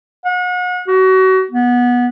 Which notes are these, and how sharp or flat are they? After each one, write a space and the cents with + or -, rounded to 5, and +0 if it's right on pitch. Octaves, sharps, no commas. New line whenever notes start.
F#5 -40
F#4 +30
B3 -15